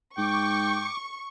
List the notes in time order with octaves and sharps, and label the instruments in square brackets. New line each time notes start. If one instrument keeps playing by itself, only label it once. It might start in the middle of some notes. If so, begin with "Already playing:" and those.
[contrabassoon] G#2 [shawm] G5 [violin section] C#6 [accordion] D6